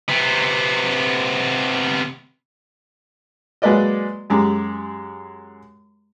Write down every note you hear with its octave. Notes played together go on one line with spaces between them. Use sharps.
C3 B3
F#3 G#3 A#3 B4 D5 D#5
F#2 G#3 G4